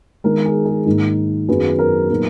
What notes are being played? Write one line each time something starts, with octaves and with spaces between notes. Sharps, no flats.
D#3 G#3 B3 A#4
G#4
G#4
G#2 D#3 A#3 D#4
F#2 D#3 F#3 B3 D#4 G#4 B4
A#4
A#2 F#3 B3 D#4